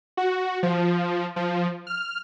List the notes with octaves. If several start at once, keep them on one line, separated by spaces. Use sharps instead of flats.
F#4
F3
F3
F6